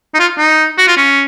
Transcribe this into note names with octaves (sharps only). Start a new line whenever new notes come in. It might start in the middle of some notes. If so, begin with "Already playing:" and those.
D#4
F4
D#4
F#4
F4
C#4